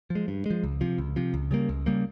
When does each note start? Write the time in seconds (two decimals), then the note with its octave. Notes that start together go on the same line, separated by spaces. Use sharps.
0.10 F3
0.15 G#3
0.28 G2
0.46 F3 G#3
0.63 C#2
0.81 C3 F3
0.98 C#2
1.16 C3 F3
1.34 C#2
1.51 C#3 G3 A#3
1.69 C#2
1.86 C#3 G3 A#3